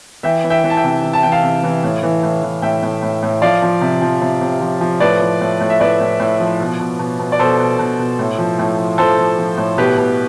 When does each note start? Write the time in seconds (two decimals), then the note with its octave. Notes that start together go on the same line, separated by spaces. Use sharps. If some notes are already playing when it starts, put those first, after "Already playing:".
0.23 E3 E5 G5
0.44 E3
0.50 E5 G5
0.64 E3
0.70 A5
0.77 E5 G5
0.84 C3
1.04 E3
1.13 A5
1.23 E3 G5
1.32 F5 A5
1.43 C3
1.63 E3
1.83 A2
2.03 E3
2.23 A2
2.43 E3
2.62 A2 E5 G5
2.82 A2
3.02 A2
3.22 A2
3.42 F3 D5 F5
3.62 F3
3.81 C3
4.02 F3
4.21 C3
4.41 C3
4.61 F3
4.81 F3
5.00 A2 B4 D5
5.21 F3
5.41 A2
5.60 A2
5.70 E5
5.80 A2 B4 D5
6.00 A2
6.20 A2
6.40 F3
6.60 B2
6.80 B2
6.99 B2
7.19 B2
7.32 D5
7.39 B2 A4 C5
7.59 B2
7.79 B2
7.99 B2
8.19 A2
8.39 F3
8.59 A2
8.79 F3
8.98 F3 A4 C5
9.18 F3
9.39 F3
9.57 A2
9.78 B2 G4 B4
9.98 B2